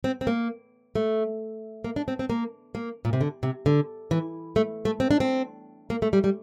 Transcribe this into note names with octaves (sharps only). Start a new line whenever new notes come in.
C4
C4
A#3
A3
A#3
D4
C4
C4
A#3
A#3
A#2
C3
D3
C3
D3
E3
A3
A3
C4
D4
C4
A#3
A3
G3
G3